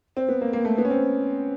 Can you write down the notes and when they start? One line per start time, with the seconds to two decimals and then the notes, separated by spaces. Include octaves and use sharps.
0.17 C4
0.29 B3
0.41 A#3
0.53 A#3
0.65 A3
0.78 B3
0.85 C#4
0.90 C4